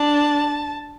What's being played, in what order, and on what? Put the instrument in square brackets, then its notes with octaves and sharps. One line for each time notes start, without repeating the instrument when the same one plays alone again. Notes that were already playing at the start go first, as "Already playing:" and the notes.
Already playing: [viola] D4 [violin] A5